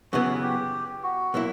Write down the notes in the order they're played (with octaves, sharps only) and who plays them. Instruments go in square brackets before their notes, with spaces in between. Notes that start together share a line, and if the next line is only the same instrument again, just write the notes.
[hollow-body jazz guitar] F#2 C#3 E3 B3 [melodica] F#4
[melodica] G4
F#4
[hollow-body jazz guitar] B2 F#3 A#3 E4